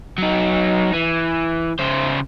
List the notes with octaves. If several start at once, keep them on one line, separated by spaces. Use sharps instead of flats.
F#3 D#4
E3
C#3 C5